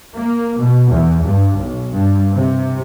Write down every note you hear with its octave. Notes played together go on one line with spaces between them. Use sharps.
A#3
B2
E2
G2
B1
G2
C3